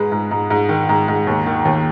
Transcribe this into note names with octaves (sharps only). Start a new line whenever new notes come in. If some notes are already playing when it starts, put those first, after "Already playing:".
Already playing: G#2 G#3 B4
G#2
G#2
G#2
D#3
G#2
G#2
D#2
D#3
D#2